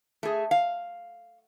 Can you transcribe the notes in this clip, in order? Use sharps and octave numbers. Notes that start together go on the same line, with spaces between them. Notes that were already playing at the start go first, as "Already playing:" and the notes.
A3 G#4
F5